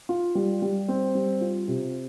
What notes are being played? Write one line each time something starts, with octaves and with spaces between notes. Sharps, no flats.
F4
G3
G3
C4
G3
F4
C3